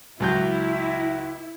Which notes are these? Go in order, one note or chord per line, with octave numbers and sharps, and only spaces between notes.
C#2 F#3 E4 G6